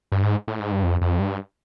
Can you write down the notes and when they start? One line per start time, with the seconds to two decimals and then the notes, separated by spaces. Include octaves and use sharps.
0.12 G2
0.23 G#2
0.48 A2
0.59 G#2
0.72 G2
0.83 F2
1.01 F2
1.19 G2